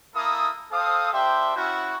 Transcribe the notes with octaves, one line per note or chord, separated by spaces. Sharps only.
A#3 E4 A4 A#4 D#6
C4 A4 C5 F5 D#6
G3 D4 G4 C5 E5 G5
C#4 E4 F#4